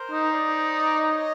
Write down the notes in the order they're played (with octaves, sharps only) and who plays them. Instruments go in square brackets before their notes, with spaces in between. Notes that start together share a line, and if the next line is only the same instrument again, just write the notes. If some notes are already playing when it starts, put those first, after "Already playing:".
Already playing: [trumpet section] A#4 C5
[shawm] D#4
[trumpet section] C5 D5
C#5 D#5